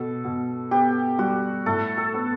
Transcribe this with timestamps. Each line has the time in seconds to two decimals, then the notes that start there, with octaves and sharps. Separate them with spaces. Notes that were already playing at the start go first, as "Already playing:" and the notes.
Already playing: B2 A4
0.24 B2
0.71 B3 G4
1.18 G3 F#4
1.66 A2 A4
1.98 A4
2.14 B3